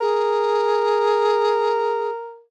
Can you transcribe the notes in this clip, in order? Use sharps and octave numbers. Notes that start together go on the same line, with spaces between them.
G#4 A#4